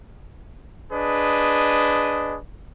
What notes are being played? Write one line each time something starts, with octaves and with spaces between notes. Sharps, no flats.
D4 G#4 B4 D#5